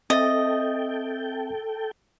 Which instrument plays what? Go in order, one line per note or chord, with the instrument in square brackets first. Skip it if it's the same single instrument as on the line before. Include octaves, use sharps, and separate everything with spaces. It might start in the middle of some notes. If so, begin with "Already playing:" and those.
[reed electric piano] C4 E5 A6 [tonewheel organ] A4 G5 [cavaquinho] D#5